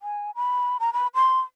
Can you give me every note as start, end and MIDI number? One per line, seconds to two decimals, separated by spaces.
0.02 0.31 80
0.35 0.78 83
0.80 0.93 82
0.93 1.07 83
1.15 1.40 84